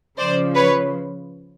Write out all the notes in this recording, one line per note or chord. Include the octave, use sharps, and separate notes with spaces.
C#3 F3 C5 D5
B4 C#5